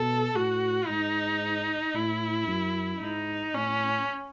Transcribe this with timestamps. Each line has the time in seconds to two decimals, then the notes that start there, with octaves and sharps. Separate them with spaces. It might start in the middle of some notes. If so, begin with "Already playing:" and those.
Already playing: B2 A4
0.35 A2 F#4
0.88 G#2 D#4
1.95 A2 E4
2.47 F#2
3.01 G#2 D#4
3.54 A2 C#4